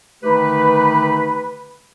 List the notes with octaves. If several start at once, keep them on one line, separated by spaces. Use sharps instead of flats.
D3 D#3 A3 D#4 G4 B4